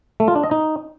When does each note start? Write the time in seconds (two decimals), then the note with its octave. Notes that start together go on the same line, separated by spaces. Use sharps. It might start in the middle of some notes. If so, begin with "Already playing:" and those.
0.20 A3
0.28 F4
0.36 D4
0.43 D#5
0.51 D#4